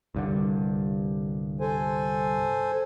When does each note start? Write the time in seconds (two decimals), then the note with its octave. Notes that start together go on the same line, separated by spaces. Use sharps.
0.15 C2 G2 D3
1.60 A4 C5 G#5